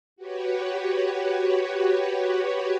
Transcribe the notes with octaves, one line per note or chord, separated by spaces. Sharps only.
F#4 G4 B4 C#5